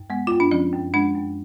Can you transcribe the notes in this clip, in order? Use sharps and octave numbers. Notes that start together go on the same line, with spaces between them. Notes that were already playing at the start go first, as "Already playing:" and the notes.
Already playing: F#2
G#3 B3
F#2 F4
D4
F3 C#4
F#2
G#3 D4
F#2